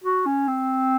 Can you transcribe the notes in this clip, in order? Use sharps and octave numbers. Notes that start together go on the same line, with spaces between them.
F#4
C#4
C4